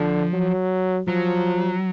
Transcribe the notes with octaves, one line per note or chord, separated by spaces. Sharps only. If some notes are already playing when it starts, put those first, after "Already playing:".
Already playing: D3 F3
F#3
F3 F#3